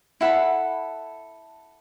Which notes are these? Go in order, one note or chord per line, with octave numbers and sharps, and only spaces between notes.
E4 A4 F#5 B5